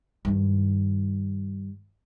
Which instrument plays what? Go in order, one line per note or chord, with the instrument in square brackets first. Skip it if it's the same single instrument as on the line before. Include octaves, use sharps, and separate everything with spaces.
[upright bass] G2 D#3